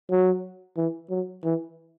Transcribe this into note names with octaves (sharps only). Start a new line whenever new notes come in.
F#3
E3
F#3
E3